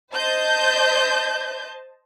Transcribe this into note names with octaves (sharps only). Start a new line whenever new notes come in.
C5 D#5 A5 G6